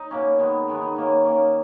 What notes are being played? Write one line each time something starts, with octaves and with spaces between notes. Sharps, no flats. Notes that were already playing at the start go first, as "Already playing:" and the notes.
Already playing: D#4
B2 A#3 C#4
D#3 G#3 B3
D#3 G#3 B3
D#4
D#3 A#3 C#4 D#4
D#3 A#3 C#4